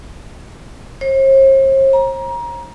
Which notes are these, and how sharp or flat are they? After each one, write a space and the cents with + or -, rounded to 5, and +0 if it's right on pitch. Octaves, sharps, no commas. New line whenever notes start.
C5 +45
A#5 +25